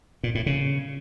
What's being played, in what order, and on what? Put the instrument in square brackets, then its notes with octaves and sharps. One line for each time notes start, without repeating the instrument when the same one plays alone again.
[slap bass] A#2
A2
C#3